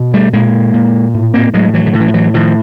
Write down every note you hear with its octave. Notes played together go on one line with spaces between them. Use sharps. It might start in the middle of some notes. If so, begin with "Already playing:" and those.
Already playing: B2
G3 A3
A#2 G#3 A#3
A#2
A2
A#3 C4
A2 F#3 G#3
E3 F#3
D3
A2 D#3
E3
F3
E3 F#3
A2 D#3 F3